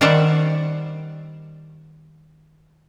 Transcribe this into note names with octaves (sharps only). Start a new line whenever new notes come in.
D#3 G3 C5 D5 E5 F#5